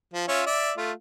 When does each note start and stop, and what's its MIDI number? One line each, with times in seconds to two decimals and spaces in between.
0.14 0.26 53
0.28 0.42 61
0.28 0.42 65
0.28 0.42 76
0.46 0.72 74
0.46 0.72 76
0.78 0.92 57
0.78 0.92 65